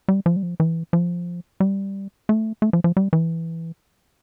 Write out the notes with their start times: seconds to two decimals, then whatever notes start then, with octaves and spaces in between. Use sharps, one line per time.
0.08 G3
0.26 F3
0.36 G3
0.43 F3
0.60 E3
0.93 F3
1.60 G3
2.29 A3
2.62 A3
2.73 F3
2.84 F3
2.97 G3
3.13 E3